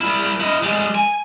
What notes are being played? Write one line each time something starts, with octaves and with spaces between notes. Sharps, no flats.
G3 E4
E4 D#5
G3 G#3
G#5